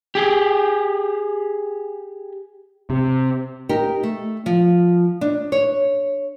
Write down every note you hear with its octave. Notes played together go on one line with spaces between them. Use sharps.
G4 G#4
C3
D#4 G4 A#4
A3
F3
D4 D#4
C#5